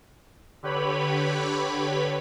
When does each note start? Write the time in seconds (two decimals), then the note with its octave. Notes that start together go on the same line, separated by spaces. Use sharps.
0.63 D3 G4 B4 C#5 B5